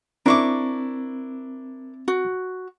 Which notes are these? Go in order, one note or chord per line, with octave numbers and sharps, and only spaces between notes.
C4 D4 E4 A#4 C#6 D6
F#4